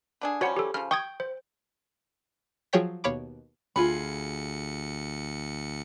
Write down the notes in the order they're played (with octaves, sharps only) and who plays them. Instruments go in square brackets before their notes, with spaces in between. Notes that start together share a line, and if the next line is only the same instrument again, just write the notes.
[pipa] D3 D4 G#4
[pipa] F3 G3 C#4 [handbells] F#4 C#5 F#5
[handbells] G4 A4
[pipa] C#3 F3 [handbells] F6
[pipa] G5 [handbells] C#6 D#6 G#6
[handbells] C5
[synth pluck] F3 F#3 G#4 C#5 G5 B6
D#2 B2 C#5 F5 B5 D6
[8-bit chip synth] D2 C#7 [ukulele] F4 G#4 B5